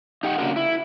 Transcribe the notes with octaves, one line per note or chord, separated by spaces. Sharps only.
D#4 G4 F#5
C#3 E3 A#3 D4 F#4 A#4
E4